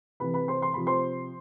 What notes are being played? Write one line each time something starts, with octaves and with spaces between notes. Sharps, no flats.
C3 E3 B4 B5
B4 B5
C5 C6
C6
C3 F3 B5
C5 C6